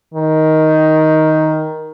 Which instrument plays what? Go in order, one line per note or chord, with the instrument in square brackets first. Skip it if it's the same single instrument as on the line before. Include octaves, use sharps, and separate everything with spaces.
[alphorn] D#3